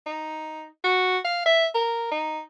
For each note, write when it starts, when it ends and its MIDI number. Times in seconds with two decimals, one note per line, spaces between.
0.06 0.66 63
0.84 1.18 66
1.24 1.42 77
1.46 1.66 76
1.75 2.07 70
2.11 2.40 63